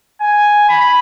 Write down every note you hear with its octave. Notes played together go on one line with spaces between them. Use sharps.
G#5
B5